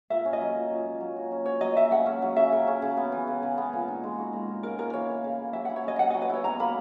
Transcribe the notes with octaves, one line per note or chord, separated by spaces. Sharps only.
A#2 E5
C#4
D#5
F#3
A#2
A#2
C#4
F#3
F#4
C#4
F#3 C#5
F#3 D#5
F#4 E5
C#3 F#5
C#4
F#3
C#3 E5
C#3
C#4
C#3
B3
E3
C#3
C#3
B3
A#2
D#4
G#3
F#4
A#2
D#4
C#3 A#4
A#3 A#4
E3 C#5
E4
C#3
A#3
F#3 E5
E4 F#5
C#5
C#4 D#5
F#3 F#5
F#3 D#5
B4
E4 C#5
B2 A#5
A#3 B5